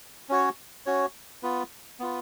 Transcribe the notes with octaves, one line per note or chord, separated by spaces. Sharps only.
C#4 F#4 C#5
C#4 F#4 C#5
B3 F4 B4
B3 F4 B4